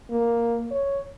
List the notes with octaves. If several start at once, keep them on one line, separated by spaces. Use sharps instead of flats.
A#3
C#5